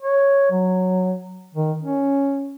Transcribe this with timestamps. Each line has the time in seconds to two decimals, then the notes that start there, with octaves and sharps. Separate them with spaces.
0.02 C#5
0.51 F#3
1.54 D#3
1.83 C#4